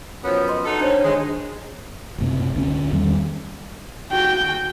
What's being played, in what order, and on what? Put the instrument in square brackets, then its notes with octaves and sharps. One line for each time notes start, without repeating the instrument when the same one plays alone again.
[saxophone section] F#2 F3 B3 [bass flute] C#5
[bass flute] D#5 [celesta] C6
[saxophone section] D#4 F#4 A4
[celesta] D4 C#5 [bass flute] C5
[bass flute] D#3 [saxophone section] G#3
[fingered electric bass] F#1 A2 C3
D2 C4 C#4
E2 D#3 G3 C#4
[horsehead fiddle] F#4 G5